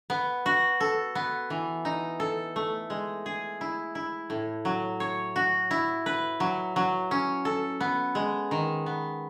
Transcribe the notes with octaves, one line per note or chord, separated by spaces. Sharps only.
B3
F#4
A4
B3
E3
D#4
A4
A3
G#3
G#4
E4
E4
A2
F#3
C#5
F#4
E4
B4
F#3
F#3
C#4
A4
B3
G#3
D#3
B3